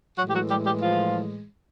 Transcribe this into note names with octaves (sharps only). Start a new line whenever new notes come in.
A2 E3 F#3 G#3 F#4
G4
F#3 F#4
G3 G4
G3 G4
F3 F4